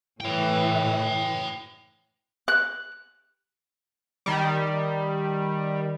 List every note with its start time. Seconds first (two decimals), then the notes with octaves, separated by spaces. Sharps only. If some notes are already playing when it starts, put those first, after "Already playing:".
0.21 A2 E3 C#5 G5
2.48 F#6
4.26 D#3 G3